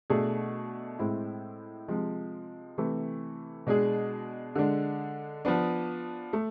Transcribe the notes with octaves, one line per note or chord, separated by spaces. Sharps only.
B2 A3 D4 G#4
A2 G#3 C4 E4
C3 F3 G#3
C3 E3 A3
B2 G#3 D4 G#4
D3 G#3 D4
F3 B3 D4
A3